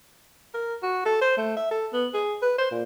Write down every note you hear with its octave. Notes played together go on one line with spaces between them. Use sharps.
A#4
F#4
A4
C5
A3
E5
A4
B3
G#4
B4
C5
A#2